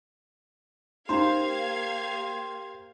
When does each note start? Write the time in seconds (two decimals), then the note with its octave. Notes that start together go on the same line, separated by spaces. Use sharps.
1.09 A#3 C#4 D#4 G4 C5 F5 A#5 G#6